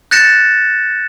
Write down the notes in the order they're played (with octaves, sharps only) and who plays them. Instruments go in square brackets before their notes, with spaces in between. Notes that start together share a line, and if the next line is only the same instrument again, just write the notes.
[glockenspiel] F#6 G6 A6 A#6 C#7 E7